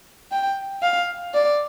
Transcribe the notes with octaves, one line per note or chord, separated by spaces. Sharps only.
G5
F5
D5